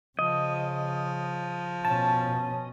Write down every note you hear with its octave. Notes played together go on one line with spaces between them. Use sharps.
C#3 F3 D#5
B2 C#4 A5